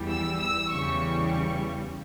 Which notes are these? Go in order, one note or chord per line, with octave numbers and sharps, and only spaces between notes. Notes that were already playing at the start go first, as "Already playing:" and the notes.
Already playing: E2 E3 G3
E6
E6
E2 C#3 E3 G3 C#6
C#6